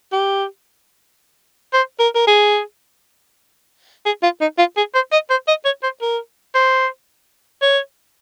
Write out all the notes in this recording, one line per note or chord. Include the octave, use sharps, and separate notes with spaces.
G4
C5
A#4
A#4
G#4
G#4
F4
D#4
F4
G#4
C5
D#5
C5
D#5
C#5
C5
A#4
C5
C#5